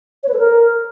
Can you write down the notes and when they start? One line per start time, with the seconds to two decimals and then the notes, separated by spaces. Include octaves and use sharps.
0.23 C#5
0.28 B4
0.34 A4
0.39 A#4